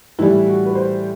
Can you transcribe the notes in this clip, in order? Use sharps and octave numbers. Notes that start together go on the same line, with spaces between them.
A2 E3 G3 E4
F#4
B4
C5